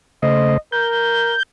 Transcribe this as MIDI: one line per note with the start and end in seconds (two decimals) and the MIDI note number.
0.23 0.57 49
0.23 0.57 57
0.23 0.57 72
0.23 0.57 75
0.72 1.36 70
0.72 1.43 91